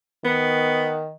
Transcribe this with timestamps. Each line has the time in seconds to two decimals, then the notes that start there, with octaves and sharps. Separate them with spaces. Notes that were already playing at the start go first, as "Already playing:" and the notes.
0.25 D#3 B3